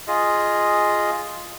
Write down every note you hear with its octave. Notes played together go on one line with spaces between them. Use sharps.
F4 G#4 D#5